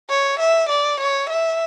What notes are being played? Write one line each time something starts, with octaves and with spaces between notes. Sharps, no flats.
C#5
E5
D5
C#5
E5